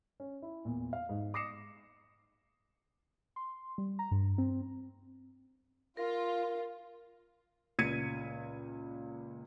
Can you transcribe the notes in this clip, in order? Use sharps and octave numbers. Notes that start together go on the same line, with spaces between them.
C#4
E4
E2 A#2
F5
G#2
D6 D#6 A#6 C7 C#7 E7
C6
G3
A#5
G2
C4
F4 A#4
C#2 A#2 G#6 B6 C#7 D#7